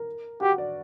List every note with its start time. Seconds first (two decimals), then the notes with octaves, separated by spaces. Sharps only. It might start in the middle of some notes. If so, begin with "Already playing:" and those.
Already playing: A#4
0.41 F#4 G4
0.58 D5